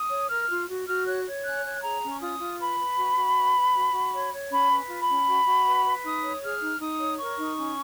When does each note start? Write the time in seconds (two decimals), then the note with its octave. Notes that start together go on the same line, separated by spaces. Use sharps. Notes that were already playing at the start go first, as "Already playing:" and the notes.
Already playing: D#6
0.10 C#5
0.29 A#4 F6
0.48 F4
0.67 F#4
0.87 F#4 F6
1.06 C#5 F#6
1.25 C#5
1.44 C#4 F#6
1.64 C#5
1.82 G#4 A#5
2.02 C#4
2.10 C#6
2.20 F4 D#6
2.40 F4
2.59 B4 B5
2.79 B4
2.97 F#4
3.16 F#4
3.36 B4
3.55 B4
3.74 F#4
3.93 F#4
4.13 C#5
4.31 C#5
4.51 C#4 B5
4.70 B4
4.89 F4
5.02 B5
5.08 C#4
5.27 F#4
5.47 F#4
5.65 B4
5.84 B4
6.03 D#4 D#6
6.23 C#5
6.42 G#4 F6
6.61 D#4
6.80 D#4 D#6
6.99 C#5
7.18 A#4 C#6
7.38 D#4
7.57 C#4